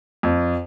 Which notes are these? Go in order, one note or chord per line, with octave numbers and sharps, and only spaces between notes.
F2